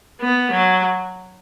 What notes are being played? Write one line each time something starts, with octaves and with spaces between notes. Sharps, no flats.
B3
F#3